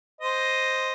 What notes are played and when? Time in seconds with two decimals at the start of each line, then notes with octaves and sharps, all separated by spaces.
0.21 C5 D#5